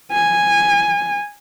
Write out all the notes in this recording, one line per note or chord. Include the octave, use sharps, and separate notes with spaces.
G#5